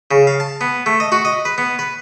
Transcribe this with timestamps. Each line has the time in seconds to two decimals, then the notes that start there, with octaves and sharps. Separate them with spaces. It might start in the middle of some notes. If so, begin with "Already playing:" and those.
0.11 C#3
0.27 F5
0.40 A5
0.61 B3
0.86 A3
1.00 D#5
1.12 F#4
1.25 D#5
1.45 B4
1.58 B3
1.79 B4